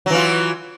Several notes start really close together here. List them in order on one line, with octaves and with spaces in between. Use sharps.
F#3 E3 F4